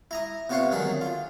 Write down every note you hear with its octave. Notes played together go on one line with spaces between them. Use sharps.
E4 A#5 D#6
C3 B3 F4 C#5 F5 F#5
D3 D#3 F#3 G#4
F4